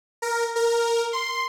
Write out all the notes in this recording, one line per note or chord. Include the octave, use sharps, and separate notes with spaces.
A#4
A#4
C6